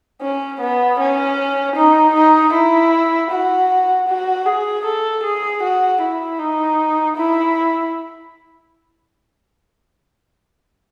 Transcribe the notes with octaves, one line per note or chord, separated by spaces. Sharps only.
C#4
B3
C#4
D#4
D#4
E4
F#4
F#4
G#4
A4
G#4
F#4
E4
D#4
E4